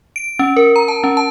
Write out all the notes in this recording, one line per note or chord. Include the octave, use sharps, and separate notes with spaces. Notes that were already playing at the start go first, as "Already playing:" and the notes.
D7
C#4
A#4
A#5
A5
C#4
A5